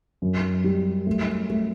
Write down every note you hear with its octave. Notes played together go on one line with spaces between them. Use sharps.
F#2
G3
A3
A3